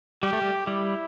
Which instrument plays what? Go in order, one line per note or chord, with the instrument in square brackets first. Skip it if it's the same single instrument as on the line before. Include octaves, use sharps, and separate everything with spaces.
[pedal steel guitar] G3 [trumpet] G4
[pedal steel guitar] A3
G3
[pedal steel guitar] G3 [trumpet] E4